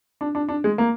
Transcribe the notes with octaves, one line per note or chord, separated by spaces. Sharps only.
D4
D4
D4
G#3
A#3